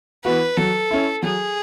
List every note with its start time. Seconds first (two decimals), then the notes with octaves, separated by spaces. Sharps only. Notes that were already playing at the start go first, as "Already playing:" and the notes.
0.24 E3 B3 F#4 B4
0.57 F#3 A4
0.91 C#4 E4
1.23 F#3 G#4